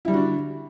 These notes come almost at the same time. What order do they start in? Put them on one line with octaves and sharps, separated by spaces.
E4 G3 D3 F#4 D4